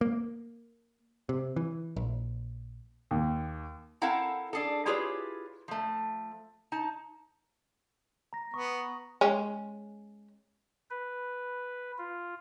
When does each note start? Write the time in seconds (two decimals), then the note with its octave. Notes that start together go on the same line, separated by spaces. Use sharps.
0.01 A#3
1.29 C3
1.56 E3
1.96 A#1
3.11 D#2
4.02 C4 E4 A4 A#4 F5 F#5
4.53 D4 G#4 A4
4.86 E4 F4 G4 G#4 B4 C#5
5.68 F3 A3
6.72 D#4 A5
8.33 A#5 A#6
8.54 B3 C#6 D#6
9.21 G#3 C#4
10.90 B4
11.98 F4